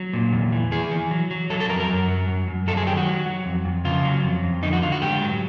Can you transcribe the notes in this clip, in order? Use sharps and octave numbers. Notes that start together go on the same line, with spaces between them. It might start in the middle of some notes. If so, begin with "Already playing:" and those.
Already playing: F#3
A#2
E2
E3
E3 G#4
E3
F#3
F#3
F#3 A4
A4
F2 A#4
A#4
F#2
F#3
F#2
F#2
F#3 A4
G#4
D#3 G4
F#4
F#3
F#3
F2
F2
C#3 F4
F#3
F2
F2
D3 D#4
F#4
D3 F4
F#4
G#2 G4
F#3